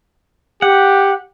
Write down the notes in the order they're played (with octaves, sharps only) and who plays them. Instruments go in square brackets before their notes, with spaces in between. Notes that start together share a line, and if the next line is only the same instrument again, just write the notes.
[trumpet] G4 [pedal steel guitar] F#5